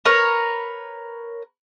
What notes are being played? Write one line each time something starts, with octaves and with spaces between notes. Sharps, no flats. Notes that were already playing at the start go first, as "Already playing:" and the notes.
A#4 B4 C#5